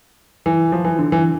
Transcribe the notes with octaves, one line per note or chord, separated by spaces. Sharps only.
E3
F3
E3
D3
E3